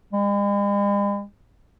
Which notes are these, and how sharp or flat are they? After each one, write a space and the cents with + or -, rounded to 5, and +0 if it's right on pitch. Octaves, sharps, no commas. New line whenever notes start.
G#3 -45